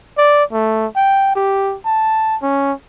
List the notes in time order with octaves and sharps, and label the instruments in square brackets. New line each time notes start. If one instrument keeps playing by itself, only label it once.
[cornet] D5
A3
G5
G4
A5
C#4